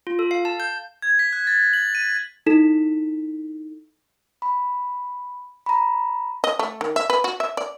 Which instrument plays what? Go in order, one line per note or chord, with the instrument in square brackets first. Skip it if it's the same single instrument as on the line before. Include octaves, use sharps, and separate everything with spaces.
[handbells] F4
A4
F5
A5
G6
[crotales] G#6
B6
F#6
A6
F#7
D#7
[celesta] D#4 E4 A4 B6 E7
[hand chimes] B5
A#5 B5
[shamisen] D#5
A3
D#3
E5
B4
F#4
E5
D5